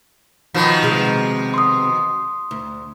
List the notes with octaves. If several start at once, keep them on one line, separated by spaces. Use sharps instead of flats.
B2 D#3 F3
C3 G#3
C6 D#6
D2